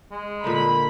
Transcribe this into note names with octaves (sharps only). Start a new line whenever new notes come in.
G#3
A#2 D3 D#4 B5